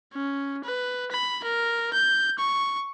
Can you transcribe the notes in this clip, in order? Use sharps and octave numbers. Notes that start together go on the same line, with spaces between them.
C#4
B4
B5
A#4
G6
C#6